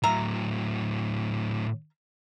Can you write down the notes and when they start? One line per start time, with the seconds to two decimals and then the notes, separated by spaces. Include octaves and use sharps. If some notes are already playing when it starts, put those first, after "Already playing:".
0.03 A2 F#3 E5 F5 A#5